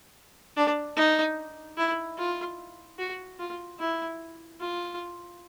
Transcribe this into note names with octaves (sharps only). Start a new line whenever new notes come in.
D4
D#4
E4
F4
F#4
F4
E4
F4